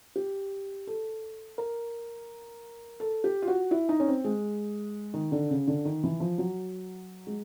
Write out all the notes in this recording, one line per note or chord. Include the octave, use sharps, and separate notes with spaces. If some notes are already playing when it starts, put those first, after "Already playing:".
G4
A4
A#4
A4
G4
F4
F#4
E4
D#4
C#4
C4
G#3
D#3
D3
C#3
D3
D#3
E3
F3
F#3
G#3